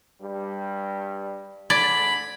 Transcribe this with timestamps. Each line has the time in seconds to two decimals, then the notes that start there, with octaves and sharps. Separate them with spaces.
0.20 G2 G3
1.70 D2 D3 G#3 D5 B5 G#6